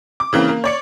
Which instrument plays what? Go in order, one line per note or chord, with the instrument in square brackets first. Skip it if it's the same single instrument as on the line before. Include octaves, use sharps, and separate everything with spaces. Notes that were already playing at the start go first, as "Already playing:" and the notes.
[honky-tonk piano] D6
C#3 E3 A#3 C4
A#3
C#5 D5 C#7